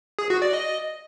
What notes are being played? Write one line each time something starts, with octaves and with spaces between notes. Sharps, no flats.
G#4
F#4
D5
D#5